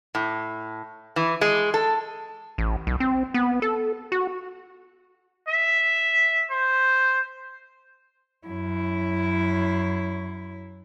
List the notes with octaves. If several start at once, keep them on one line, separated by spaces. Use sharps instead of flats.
A2
E3
G#3
A4
A1
B1
C4
B3
A4
F#4
E5
C5
F#2 E4